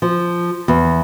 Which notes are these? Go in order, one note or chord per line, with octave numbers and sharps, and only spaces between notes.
F3
E2